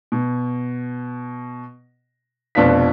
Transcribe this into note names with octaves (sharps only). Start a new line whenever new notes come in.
B2
F1 B2 D4 F4 B4 B6